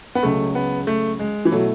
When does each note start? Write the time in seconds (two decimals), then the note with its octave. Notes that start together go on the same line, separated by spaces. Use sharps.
0.15 B3
0.23 C#2 C#3 F#3 A3 C#4 G#4
0.55 B3
0.87 A3
1.19 G#3
1.45 E3
1.52 B2 F#3 A3 E4 A4